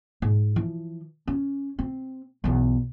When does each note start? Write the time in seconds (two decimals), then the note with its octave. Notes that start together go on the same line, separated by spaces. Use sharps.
0.22 G#2
0.56 E3 F3
1.27 C#4
1.79 C4
2.44 B1 E2